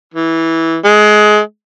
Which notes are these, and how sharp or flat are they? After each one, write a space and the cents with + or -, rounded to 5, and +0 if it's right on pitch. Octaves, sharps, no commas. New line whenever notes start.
E3 -15
G#3 +20